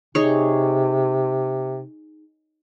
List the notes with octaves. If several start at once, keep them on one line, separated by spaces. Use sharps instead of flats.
C3 D#4 G#4 C#5